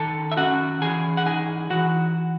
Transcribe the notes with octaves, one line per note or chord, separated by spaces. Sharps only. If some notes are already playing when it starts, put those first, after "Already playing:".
Already playing: D#3 A4 A5
E5
C#4 F#4 F#5
E3 G#4 G#5
F#5
D#4 G#4 G#5
E3 F#4 F#5